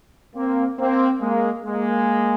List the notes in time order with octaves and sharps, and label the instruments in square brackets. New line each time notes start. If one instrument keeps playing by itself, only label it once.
[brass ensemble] A#3 C4
A#3 C4
G#3 A#3
G#3 A#3